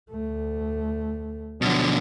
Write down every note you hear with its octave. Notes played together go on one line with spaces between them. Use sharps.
D2 A3
B2 D3 F3 F#3